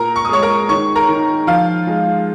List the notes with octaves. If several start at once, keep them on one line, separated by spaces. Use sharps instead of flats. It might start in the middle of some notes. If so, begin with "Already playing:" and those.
Already playing: A#2 A#4 A#5
C#6
D#6
G#3 C#5 C#6
A#4 A#5
D#3 C#5 C#6
A#4 A#5
D#3
F3 F4 F5
G#3